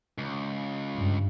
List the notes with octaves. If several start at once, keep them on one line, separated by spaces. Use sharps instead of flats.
C#2
G2